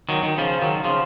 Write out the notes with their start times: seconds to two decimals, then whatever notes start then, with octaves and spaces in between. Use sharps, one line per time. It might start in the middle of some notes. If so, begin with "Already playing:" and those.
0.09 D#3 F#3
0.23 D#3
0.38 C#3 F3
0.62 D#3 F#3
0.84 C#3 F3